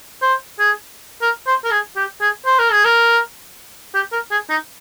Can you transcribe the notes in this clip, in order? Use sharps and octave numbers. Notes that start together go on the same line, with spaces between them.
C5
G#4
A#4
C5
A#4
G#4
G4
G#4
C5
A#4
G#4
A#4
G4
A#4
G#4
D#4